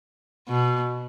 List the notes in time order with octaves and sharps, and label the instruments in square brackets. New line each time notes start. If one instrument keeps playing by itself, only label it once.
[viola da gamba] B2